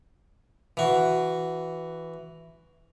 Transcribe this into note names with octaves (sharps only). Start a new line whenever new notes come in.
E3 F#4